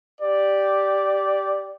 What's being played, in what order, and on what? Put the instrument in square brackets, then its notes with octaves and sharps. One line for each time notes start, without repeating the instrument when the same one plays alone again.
[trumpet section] G4 D5